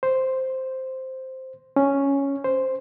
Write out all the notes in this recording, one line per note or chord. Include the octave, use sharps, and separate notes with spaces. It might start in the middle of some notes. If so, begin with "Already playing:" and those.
C5
C#4
C5